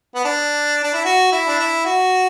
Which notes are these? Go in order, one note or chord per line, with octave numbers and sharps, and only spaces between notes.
B3
D4
D4
E4
F#4
E4
D4
E4
F#4